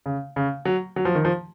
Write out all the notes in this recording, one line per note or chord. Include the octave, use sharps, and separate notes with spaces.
C#3
C#3
F#3
F#3
F3
D#3
F3